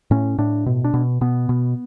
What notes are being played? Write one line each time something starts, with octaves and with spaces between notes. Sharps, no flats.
A2 C#4
A2 D4
B2
D4
B2
B2 B3
B2